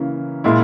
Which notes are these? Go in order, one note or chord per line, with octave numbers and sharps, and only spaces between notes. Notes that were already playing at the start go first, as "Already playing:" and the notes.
Already playing: C#3 E3 A#3
A#2 G#3 E4